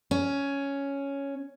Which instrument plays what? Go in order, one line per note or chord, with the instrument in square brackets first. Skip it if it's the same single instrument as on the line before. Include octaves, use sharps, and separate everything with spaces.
[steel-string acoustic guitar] C#4